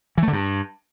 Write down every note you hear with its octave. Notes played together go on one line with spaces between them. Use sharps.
E3
A3
D3
G2